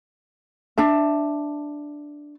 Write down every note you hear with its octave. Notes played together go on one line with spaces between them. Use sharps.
D4 E5 A5